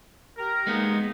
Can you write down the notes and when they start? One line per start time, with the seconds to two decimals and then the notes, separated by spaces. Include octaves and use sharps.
0.37 G4 A#4
0.67 G#3 A#3 B3 D#4